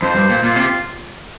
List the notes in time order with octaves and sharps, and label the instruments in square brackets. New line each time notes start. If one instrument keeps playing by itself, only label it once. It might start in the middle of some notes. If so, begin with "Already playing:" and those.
[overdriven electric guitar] F2 [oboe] C5
[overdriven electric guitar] G2
A#2
[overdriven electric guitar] A#2 [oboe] F4
[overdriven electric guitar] C3